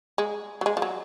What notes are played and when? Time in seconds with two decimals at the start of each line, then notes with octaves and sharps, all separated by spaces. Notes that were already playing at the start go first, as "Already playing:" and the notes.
0.18 G#3
0.61 F#3
0.66 G#3
0.77 F3
0.82 F#3